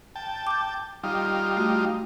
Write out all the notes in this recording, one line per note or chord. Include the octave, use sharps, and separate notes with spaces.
G5 A5
D6 G6
G3 D#4 F4
A3 F#4